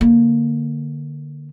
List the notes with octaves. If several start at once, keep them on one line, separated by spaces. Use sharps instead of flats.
D3 A#3